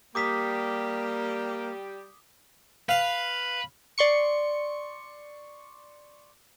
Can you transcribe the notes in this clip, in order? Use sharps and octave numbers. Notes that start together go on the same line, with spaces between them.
G3 A#3 G4 D6 D#6 B6
B4 F5
D5 C6 C#6 C#7